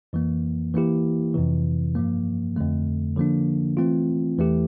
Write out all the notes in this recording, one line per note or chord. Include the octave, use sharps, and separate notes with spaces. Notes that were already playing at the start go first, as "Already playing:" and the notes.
F2 E3 A#3
E3 A#3 E4 G4
F2 C3 E3
G2 F3 A#3
F2 D3 A3
D3 F3 A#3 D4
E3 A3 C4 F4
E2 E3 A3 E4 G4